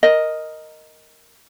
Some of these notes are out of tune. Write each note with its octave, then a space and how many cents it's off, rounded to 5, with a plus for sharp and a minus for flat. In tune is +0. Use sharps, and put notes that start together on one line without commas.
A#4 +0 D#5 +0